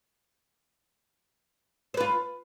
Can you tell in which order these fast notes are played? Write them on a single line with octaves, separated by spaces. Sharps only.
C5 B4 F4